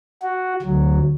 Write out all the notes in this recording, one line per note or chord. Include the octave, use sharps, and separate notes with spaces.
F#4
D2 F#3